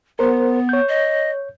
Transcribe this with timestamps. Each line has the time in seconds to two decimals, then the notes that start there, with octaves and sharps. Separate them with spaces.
0.19 B3 A#4 C5
0.69 C#5 G6
0.88 D#5